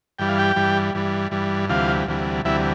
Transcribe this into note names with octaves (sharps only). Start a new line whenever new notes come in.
G2 E3 G3 G5
F5
G4 G5
G2 E3 G3
G2 E3 G3
G2 E3 G3
D2 C3 E3 G3 F4 F5
D2 C3 E3 G3
D2 C3 E3 G3 E4 E5